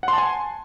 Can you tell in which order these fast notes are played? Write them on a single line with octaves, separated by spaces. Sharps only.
F#5 C6 A5 G#5